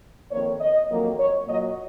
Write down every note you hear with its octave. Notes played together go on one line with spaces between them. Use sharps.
F2 D#3 A#3 C#5
D#5
F2 D#3 F#3 A#3
C#5
A#2 F#3 A#3 D#5